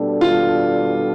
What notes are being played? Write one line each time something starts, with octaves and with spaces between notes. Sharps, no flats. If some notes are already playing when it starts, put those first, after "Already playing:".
Already playing: B2 G3 D4 A4
F4